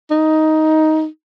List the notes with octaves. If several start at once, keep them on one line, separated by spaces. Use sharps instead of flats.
D#4